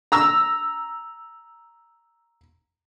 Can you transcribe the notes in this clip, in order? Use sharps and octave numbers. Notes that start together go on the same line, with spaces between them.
A#5 E6